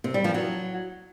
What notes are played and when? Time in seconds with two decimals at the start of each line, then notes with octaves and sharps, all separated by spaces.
0.04 C3
0.14 G3
0.24 F3
0.34 F#3